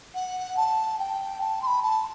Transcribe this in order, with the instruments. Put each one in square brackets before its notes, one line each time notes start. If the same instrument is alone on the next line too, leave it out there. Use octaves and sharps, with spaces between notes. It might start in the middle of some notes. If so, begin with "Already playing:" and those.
[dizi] F#5
A5
G5
A5
C6
B5
A5